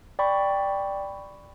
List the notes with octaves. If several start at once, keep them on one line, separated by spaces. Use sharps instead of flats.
D5 G5 B5 C#6